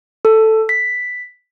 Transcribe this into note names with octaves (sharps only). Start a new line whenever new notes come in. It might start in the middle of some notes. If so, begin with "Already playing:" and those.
A4
B6